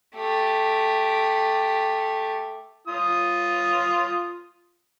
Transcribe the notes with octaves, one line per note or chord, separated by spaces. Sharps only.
A3 G4
F4 D#6